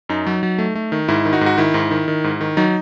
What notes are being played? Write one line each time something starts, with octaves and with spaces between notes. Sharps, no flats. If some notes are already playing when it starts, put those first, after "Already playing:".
F#2 D#4
F#3
F#3
A3
A3
D#3
G#2 E4
D#3
D#4 F#4
G#2
F#4
D#3 E4
G#2
D#3
D#3
G#2
D#3
F#3 D#4